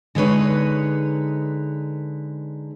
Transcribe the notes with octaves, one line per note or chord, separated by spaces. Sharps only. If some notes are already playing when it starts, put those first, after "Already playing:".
D3 G#3 D#4 B4 C#5